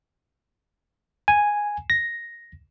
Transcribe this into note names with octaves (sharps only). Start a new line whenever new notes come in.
G#5
A#6